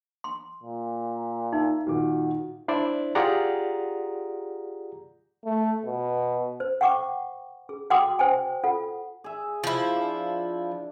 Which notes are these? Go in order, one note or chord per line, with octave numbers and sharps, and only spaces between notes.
C6
A#2
D#4 E5
A#2 D#3 F#4 D6
D4 E4 C5 D5 E5
F4 G4 G#4 D5 F#5 A#5
A3
B2
C5
F#5 G5 C#6 D6
G#4
F#4 F#5 G5 C6 D6 D#6
C5 G5 G#5
F4 A4 F#5
G#4 E5
F3 E4
D4